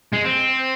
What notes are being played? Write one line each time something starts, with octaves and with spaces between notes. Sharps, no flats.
G#3
C4